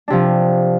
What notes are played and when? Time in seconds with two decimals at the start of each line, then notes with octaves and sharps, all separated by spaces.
0.08 D4
0.10 C3
0.13 F3